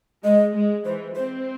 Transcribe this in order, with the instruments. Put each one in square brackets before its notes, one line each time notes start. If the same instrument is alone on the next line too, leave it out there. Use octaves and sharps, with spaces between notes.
[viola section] G#3 [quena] D#5
[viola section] G#3
[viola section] E3 [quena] C5
[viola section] C4 [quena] C5